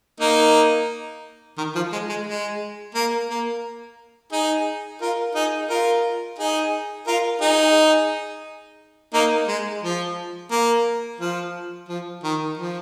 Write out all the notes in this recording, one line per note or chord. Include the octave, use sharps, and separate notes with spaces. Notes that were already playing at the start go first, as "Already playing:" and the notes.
A#3 D#4
D#3
F3
G#3
G#3
G#3
A#3
A#3
D#4 G#4
F4 A#4
D#4 G#4
F4 A#4
D#4 G#4
F4 A#4
D#4 G#4
A#3 D#4
G#3
F3
A#3
F3
F3
D#3
F3